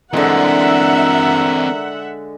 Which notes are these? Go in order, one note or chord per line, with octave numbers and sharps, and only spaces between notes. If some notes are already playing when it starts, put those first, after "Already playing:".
D3 E3 G#3 C4 A#4 E5 F#5